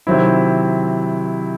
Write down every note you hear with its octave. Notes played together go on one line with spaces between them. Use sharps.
C3 D#3 F#3 C4 E4